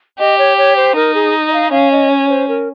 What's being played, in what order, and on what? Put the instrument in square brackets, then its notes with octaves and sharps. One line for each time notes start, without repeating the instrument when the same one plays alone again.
[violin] G4 [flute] D#5
[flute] C#5
C#5
C5
[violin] D#4 [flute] A#4
[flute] G#4
D#5
F5
[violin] C#4 [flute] F5
[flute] D#5
C#5
C5
A#4